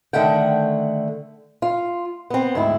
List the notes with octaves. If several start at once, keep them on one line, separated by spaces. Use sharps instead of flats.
D3 D#3 A3 F#5 G5
F4
B3 C4
D2 G#2 E4